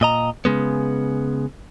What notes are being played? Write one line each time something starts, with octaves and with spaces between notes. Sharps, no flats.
A#2 D#5 A#5
C#3 G#3 B3